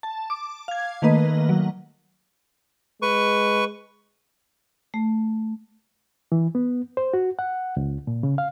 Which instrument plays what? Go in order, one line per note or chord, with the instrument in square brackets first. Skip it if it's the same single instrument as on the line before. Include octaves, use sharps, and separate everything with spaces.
[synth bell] A5
D6
F5 G#6
D#3 A3 A#3 B4 D#5
F#3
[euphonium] G#3 [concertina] B4 C#6
[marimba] A3
[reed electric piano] E3
B3
C5
F#4
F#5
C#2
A#2
C#3
F5